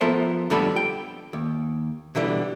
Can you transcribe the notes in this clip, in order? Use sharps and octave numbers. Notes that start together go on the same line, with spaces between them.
F3 B3 A4 A#4 C5 E5
F2 D3 G3 B3 A4 B5
G5
D#2
B2 D3 E3 G3